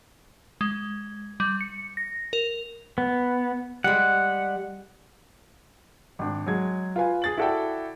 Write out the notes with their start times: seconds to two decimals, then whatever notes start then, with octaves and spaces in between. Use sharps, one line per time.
0.61 G#3
1.40 G3
1.61 C#7
1.97 A#6
2.33 A#4
2.98 B3
3.84 G3 G#3 F#5
6.19 G#1 D4
6.46 F#3 G#3 G#6
6.96 F4 B4 G#5
7.22 G#4 A6 F#7
7.38 E4 F#4 A4 D5 G5